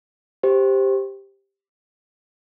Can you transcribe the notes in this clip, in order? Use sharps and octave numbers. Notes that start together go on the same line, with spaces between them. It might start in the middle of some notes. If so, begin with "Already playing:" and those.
G4 C5